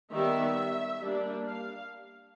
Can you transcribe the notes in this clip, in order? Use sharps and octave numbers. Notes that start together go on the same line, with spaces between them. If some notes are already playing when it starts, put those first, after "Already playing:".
D#3 G3 B3 E5
G3 A#3 D4
F5